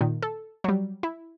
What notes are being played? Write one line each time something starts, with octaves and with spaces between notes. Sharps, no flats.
A#2 D#3
A4
F#3 G3
E4